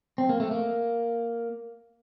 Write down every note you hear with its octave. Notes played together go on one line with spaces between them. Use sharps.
C4
A#3
A3
A#3